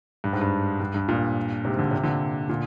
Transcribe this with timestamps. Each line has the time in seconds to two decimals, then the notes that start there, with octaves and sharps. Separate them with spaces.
0.24 G2
0.33 G#2
0.41 G2
0.80 G2
0.94 G2
1.08 G2 A#2
1.65 G#2 C3
1.79 D3
1.91 C3
2.03 A#2 D3
2.49 A#2 D3